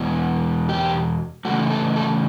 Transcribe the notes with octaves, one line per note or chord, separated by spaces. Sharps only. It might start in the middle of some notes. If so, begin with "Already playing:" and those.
Already playing: E2 B2
G4
C#3 E3 A3 F#4
A4
A4